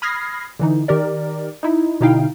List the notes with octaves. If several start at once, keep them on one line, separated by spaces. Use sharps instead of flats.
B5 D#6 F6 G#6 A#6 C7
D3 E3 D#4
D#3 G4 A#4 D5
D#4 E4
B2 D3 D#4 E4 F5 G5